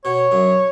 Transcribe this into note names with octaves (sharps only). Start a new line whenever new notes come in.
B2 C#5
F#2